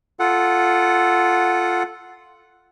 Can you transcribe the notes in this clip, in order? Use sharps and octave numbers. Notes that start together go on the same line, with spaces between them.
F4 A4 F#5